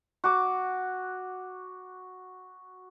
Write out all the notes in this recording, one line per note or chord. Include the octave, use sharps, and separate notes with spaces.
F#4 D6